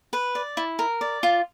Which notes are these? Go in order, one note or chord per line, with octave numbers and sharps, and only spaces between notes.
B4
D5
E4
A#4
D5
F4